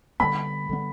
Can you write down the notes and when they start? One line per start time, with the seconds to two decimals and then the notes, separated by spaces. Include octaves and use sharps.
0.20 D3 G3 B3 B5
0.69 D3 G3 B3